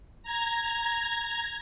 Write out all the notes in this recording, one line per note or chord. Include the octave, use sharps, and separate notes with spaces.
A#5 G#6